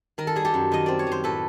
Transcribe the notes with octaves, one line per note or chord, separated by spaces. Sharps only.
D#3 A#4
A4
G3 G#4
G4 A4
F#2
D#3 D#5
C4 D5
C#5
D#3 C5
A2 A4 B4